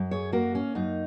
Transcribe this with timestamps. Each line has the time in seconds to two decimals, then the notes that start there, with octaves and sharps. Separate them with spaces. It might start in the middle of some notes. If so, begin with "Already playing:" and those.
Already playing: F#2
0.11 G#4 C#5
0.33 A#3 F#4 A#4
0.55 C#4
0.75 F#2 D#4